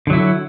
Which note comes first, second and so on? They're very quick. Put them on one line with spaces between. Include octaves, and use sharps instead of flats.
D3 F#3 E4